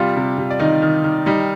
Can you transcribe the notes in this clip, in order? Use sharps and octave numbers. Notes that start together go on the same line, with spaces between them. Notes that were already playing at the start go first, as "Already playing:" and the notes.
Already playing: C3 G3 F4 F5
C3
C3
D5
D#3 D#4 D#5
D#3
D#3
G3 D#4 D#5